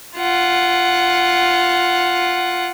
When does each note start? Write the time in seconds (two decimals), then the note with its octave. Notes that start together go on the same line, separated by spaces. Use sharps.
0.17 F4 F#5